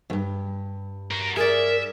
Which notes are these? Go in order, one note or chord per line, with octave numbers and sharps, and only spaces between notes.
E2 G2
F#4 A#4
G#4 A#4 D5 E5